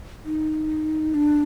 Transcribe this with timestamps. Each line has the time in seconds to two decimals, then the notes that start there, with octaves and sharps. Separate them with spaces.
0.25 D#4
1.14 D4